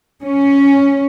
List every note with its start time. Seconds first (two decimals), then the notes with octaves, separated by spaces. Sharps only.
0.23 C#4